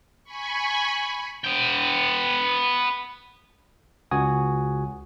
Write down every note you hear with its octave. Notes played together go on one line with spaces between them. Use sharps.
G#5 B5 C#6
B3 G5
C#2 F#4 G#5 D#6